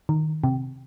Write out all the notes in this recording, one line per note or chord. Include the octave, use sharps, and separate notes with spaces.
D#3
C3